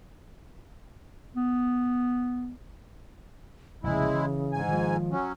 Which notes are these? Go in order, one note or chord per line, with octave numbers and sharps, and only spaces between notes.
B3
F1 A#1 C#3 G#3 E4
E3
G#2 G#5
D#3 F3 G#3
F#3 C#4